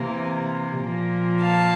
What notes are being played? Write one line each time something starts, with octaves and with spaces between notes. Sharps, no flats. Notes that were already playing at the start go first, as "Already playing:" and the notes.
Already playing: C3 E3 A#3
A#2 F3 A#3
F5 A5